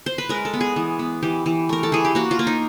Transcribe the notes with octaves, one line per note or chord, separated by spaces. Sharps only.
C5
B4
G#3 A#4
A4
B3
G#4
E3
B3
E3 G4
E3
A3 A#4
A4
E3 G#4
G4
A#3 F#4
F4
A#3
D#4